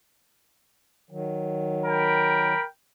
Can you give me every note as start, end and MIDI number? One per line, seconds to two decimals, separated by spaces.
1.11 2.53 51
1.11 2.53 54
1.86 2.65 70
1.86 2.65 79
1.86 2.65 83